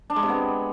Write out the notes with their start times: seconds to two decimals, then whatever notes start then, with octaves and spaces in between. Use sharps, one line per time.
0.10 D4
0.16 G#3
0.23 C3
0.29 B3